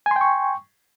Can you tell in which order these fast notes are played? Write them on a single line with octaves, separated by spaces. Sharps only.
G#5 C6 G5 C#6